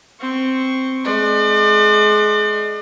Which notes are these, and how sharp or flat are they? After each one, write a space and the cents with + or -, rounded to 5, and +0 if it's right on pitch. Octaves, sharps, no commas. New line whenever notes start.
C4 +0 C#6 +0
G#3 +25 D5 +40